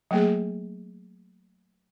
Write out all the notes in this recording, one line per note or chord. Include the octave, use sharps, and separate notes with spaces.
F#3 A3 A#3 G#4